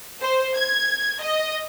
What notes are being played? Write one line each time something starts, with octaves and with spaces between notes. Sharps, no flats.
C5
G#6
D#5